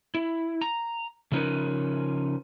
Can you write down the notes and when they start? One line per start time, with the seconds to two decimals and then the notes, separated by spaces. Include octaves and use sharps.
0.15 E4
0.62 A#5
1.32 C#3 F3 C#4 D#4 A#4 B4